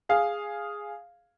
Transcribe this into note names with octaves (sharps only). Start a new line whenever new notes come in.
G#4 F5